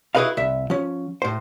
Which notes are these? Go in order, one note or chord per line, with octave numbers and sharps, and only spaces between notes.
E4 F#4 G#4 B4 D#5 F5
C2 E5
F3 C#4
A2 C5